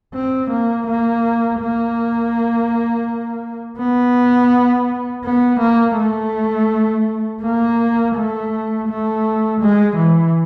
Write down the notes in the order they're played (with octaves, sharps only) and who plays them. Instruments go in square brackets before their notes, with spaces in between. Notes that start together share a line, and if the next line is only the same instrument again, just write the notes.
[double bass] C4
A#3
A#3
A#3
B3
B3
A#3
A3
A#3
A3
A3
G#3
E3